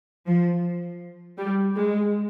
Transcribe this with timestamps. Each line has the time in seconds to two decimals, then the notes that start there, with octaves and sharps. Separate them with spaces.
0.27 F3
1.38 G3
1.75 G#3